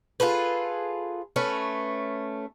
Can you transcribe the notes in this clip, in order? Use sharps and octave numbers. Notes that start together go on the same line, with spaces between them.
F4 G#4 A4 B4
A3 C#4 B4